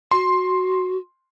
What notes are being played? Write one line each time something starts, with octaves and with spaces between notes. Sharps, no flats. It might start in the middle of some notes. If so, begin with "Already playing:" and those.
F#4 C6